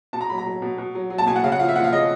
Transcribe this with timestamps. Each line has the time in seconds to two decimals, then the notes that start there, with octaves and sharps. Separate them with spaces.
0.13 B2 A5
0.21 A#5
0.29 F#3 B5
0.38 A#5
0.46 F#3
0.62 B2
0.78 B2
0.95 F#3
1.10 F#3
1.18 A5
1.27 B2 G#5
1.36 F#5
1.43 C#3 F5
1.52 F#5
1.59 F3 F5
1.68 E5
1.76 F3 F#5
1.84 F5
1.92 C#3 D#5